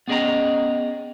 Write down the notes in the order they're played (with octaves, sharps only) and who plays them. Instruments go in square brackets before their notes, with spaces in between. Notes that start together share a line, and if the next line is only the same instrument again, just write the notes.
[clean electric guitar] B3 C#4 G#4 D#5 G5 A#5